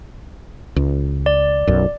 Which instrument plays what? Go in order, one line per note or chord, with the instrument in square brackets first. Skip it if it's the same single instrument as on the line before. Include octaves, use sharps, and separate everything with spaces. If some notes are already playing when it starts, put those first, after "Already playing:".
[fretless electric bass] C#2
[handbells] D5
[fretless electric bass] B1 F#2